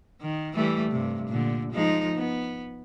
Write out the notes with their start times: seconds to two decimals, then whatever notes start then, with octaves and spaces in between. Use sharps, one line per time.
0.21 D#3
0.55 E3 G3 A3
0.91 G2 C3
1.28 A#2 D3
1.72 F3 G#3 D#4
2.15 B3